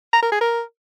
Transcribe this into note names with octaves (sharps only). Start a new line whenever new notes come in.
A#5
A#4
G#4
A#4